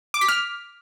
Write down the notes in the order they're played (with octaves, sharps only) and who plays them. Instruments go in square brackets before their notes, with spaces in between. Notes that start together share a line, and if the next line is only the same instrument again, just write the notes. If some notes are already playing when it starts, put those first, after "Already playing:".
[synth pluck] D6
B6
F6